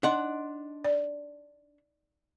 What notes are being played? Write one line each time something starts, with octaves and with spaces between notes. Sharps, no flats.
D4 D#4 D#5 F#5 C6
D5